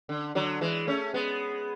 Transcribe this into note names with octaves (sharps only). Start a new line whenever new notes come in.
D3
D3 F#3
E3 G#3
A3 C#4
G#3 B3